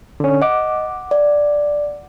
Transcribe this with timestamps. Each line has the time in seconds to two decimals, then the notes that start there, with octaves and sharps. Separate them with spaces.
0.20 D3 C#4
0.42 D#5 F#5 D6
1.11 D5